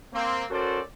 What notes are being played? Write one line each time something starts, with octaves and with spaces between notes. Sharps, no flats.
A#3 C4
C#4 F#4 A4 A#4 C5 D5